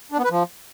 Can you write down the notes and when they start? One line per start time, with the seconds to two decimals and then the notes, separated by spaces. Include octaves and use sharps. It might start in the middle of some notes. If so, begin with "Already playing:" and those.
0.12 D4
0.18 B3
0.24 B4
0.30 F3